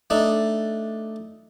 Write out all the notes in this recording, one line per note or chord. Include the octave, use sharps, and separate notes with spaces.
A3 D4 D#4